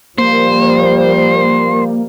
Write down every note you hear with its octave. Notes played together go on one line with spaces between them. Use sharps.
F3 G3 A#3 C5